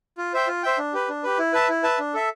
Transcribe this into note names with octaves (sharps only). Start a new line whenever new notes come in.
F4
C5 E5 G5
F4
C5 E5 G5
D4
G4 B4
D4
G4 B4
E4
B4 E5 A5
E4
B4 E5 A5
D4
A4 E5